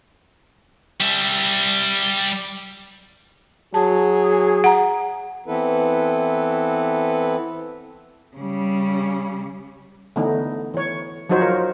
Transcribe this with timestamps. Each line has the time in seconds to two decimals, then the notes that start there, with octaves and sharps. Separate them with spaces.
1.01 G3 E5
3.74 F#3 G#4 A5
4.64 F#5 A#5
5.47 E3 B3 C4 E4 A4 B4
8.37 C#3 G3
10.16 D3 E3 A3 B3 D#4
10.74 E3 C#5
11.29 F3 F#3 D#4 F#4 C5 C#5
11.41 F4 A#4